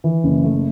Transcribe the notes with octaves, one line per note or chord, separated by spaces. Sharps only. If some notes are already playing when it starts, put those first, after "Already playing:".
E3
F#1
A3